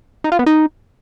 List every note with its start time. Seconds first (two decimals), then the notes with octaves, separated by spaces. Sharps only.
0.24 D#4
0.32 F4
0.39 B3
0.46 D#4